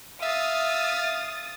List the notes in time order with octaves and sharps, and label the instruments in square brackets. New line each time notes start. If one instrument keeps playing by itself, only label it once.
[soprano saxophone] E5 [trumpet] F5 [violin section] D#6 A6